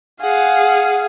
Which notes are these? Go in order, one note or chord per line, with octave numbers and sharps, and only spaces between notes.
G#4 F5 F#5